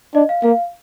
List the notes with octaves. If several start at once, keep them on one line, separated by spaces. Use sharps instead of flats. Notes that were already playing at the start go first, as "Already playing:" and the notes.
D4 D#5
F5
A#3 F5